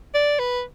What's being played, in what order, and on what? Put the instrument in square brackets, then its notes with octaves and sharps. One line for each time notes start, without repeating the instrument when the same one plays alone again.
[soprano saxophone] D5
B4